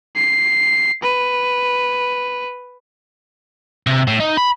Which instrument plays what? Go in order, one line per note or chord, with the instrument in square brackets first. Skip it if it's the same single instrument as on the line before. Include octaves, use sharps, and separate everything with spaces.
[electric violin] C7
B4
[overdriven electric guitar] C3
A2
D#4
B5